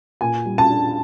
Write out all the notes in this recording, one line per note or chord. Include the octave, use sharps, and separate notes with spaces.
A#2 G#5
G3
A5
D4